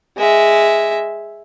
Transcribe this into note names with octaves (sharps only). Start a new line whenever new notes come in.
G#3 E5